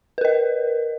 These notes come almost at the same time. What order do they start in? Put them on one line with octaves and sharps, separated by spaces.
B4 A#4 D#5